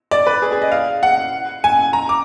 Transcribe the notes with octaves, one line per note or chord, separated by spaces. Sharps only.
D5
B4
G#4
G#4
D#5
F5
F#5
G#5
A#5
D6